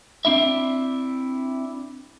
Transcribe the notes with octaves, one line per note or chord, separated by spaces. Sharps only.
C4 D4 E4 E5